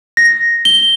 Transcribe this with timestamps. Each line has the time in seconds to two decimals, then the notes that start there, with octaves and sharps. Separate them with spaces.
0.17 A#6
0.65 G7